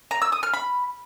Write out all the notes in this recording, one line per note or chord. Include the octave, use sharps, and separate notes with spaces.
A#5
E6
D#6
F6
B5